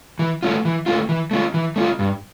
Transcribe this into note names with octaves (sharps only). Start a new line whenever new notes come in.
E3
A3 C#4 F4
E3
A3 C#4 F4
E3
A3 C#4 F4
E3
A3 C#4 F4
G2